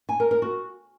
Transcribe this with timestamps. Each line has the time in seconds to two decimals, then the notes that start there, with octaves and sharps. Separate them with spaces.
0.09 G#5
0.20 A#4
0.31 A#4
0.42 F#4